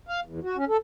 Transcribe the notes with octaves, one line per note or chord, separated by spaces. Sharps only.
F5
E2
F#4
C#4
A4